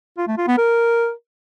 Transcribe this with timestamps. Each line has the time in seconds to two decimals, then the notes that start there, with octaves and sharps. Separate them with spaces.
0.17 F4
0.27 A3
0.38 F4
0.48 B3
0.58 A#4